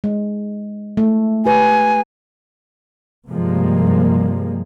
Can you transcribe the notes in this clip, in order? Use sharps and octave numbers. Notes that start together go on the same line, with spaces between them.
G#3
A3
G4 B4 G#5
G2 C3 F3 G3 G#3 A#3